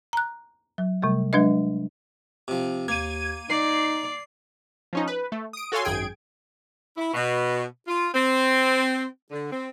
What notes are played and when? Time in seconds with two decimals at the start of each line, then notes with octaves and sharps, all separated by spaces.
0.13 A#5 F#6
0.78 F#3
1.02 C3 G3 A3
1.33 F#3 G#3 D4 B4 D#5
2.48 C3 F3
2.88 D#2 A#3 G#6 D#7
3.50 D#4 D5 C7
4.93 F3 C#4 D#4
5.08 B4
5.32 A3
5.53 D#6 D7
5.72 F#4 A4 C#5 F5 G#5 C6
5.85 G#1 F#2 G#4 G5 G#6 D7
6.97 E4
7.13 B2
7.87 F4
8.15 C4
9.30 D3
9.52 C4